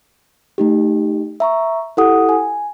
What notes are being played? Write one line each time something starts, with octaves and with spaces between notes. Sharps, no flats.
A3 D#4 G4
E5 A#5 C#6
E4 G4 A4 F#5 D#6
G#5